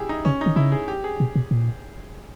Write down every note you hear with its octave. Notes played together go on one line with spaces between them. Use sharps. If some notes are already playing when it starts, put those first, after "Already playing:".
Already playing: E4 G4 G#4
D#4
C#3 C#4
D#3 D#4
C#3 E4
G#4
G4
G#4
B2
B2
A#2